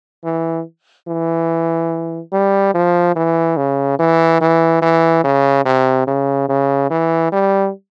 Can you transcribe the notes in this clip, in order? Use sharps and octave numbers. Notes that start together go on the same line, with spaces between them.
E3
E3
G3
F3
E3
C#3
E3
E3
E3
C#3
C3
C#3
C#3
E3
G3